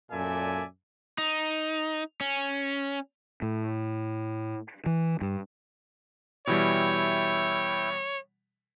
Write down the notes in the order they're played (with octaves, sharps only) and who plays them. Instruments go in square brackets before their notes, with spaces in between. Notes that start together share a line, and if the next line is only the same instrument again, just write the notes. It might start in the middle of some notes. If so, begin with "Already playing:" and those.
[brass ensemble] F#2 A#2 A4 D5 E5 G#5
[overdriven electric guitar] D#4
C#4
[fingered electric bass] A2
E3
G2
[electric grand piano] B2 E3 G3 [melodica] E4 E5 G5 [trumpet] C#5